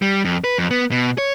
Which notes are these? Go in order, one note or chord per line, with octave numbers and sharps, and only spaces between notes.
G3
F2
B4
F2
B3
B2
C#5